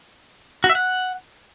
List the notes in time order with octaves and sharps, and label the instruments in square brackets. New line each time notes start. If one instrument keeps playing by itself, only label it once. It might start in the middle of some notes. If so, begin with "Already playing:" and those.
[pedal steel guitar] F#4
E5
F#5